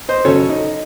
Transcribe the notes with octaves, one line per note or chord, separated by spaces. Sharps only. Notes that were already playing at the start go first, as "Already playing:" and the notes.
C5 D#5
C#3 F#3 C#4 A4 C#5
D#4